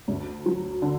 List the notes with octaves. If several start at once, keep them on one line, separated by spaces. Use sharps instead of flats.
D2
F#3
D3